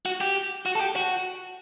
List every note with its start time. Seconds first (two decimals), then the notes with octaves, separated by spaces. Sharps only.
0.06 F#4
0.21 G4
0.66 F#4
0.75 A4
0.80 G4
0.96 F#4